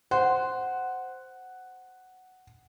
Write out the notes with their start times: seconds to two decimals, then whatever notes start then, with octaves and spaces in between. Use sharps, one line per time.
0.11 C5 F#5